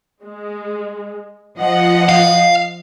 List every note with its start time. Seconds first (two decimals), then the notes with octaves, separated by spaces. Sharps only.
0.23 G#3
1.57 F3 D#5 F#5
2.09 F5